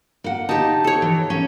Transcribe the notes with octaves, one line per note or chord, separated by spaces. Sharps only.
A#3 F#5
D#4 G4 A5
A4 C#5
E3
C#4